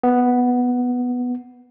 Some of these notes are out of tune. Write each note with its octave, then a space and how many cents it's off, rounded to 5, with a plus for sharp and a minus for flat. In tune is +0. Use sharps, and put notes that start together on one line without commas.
B3 +0